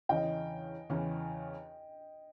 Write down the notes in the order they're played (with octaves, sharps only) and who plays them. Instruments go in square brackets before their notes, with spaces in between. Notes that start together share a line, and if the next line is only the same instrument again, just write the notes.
[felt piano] E2 C#3 E3 [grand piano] D#5 G5
[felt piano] E2 C#3 E3